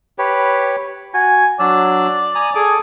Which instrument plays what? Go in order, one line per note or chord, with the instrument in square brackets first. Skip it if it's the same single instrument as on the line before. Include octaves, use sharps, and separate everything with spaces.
[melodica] G4 B4 C#5
[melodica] F#4 [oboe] G#5
[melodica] F#3 D4 E6 [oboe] D5
[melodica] G#5 A#5 D#6
[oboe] G#4 [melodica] A4 G#5 D6